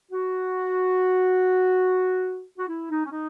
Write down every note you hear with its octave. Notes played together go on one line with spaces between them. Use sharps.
F#4
F#4
E4
D#4
C#4
D#4